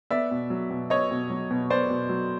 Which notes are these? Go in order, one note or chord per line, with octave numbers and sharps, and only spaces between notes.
B3 D5 E5
B2
F#3
B2
B3 C#5 D#5
B2
F#3
B2
B3 C5 D5
B2
F#3